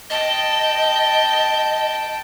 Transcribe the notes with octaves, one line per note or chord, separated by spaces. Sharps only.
D#5 G5 A5